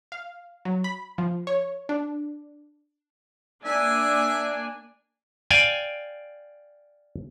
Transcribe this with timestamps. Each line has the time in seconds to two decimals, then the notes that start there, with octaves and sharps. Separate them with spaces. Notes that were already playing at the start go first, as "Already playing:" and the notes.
0.12 F5
0.65 F#3
0.84 B5
1.18 F3
1.47 C#5
1.89 D4
3.65 A#3 D4 E5 G#5
5.51 D5 F5 G5 G#5